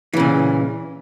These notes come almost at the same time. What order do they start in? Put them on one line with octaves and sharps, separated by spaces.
E3 C#3 A#2